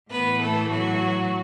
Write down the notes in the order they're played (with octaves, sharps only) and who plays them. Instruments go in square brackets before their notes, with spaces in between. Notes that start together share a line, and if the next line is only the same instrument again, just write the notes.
[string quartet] A2 E3 B3 B4
A3 A4
F#3 F#4